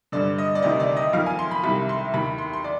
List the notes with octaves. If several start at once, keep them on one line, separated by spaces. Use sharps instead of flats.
G2 D3 D5
D#5
D5
D2 C3 D#3 D#5
D5
D#5
F2 D#3 F5
G#5
C6
B5
C2 C3 D#3 B5
C6
D#2 D#3 B5
C6
C6
D5